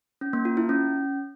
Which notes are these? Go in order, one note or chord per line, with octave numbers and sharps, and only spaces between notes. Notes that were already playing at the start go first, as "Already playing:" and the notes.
C#4
A#3
F4
E4
C#4